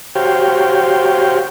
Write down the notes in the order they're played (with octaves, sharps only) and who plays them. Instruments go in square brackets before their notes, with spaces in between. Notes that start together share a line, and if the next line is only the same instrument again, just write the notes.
[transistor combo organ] F#4 G4 C5 C#5 F5 G5